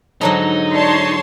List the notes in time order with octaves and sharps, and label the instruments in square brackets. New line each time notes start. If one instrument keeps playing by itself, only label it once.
[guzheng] G#2 D3 F#3 [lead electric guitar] D#4 [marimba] C#5 A5 A#5
[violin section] C#5 A5 C6 [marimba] D5